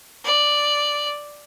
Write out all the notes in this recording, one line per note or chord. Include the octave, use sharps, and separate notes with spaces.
D5